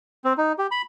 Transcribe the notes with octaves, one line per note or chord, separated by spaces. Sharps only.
C4
D#4
G4
B5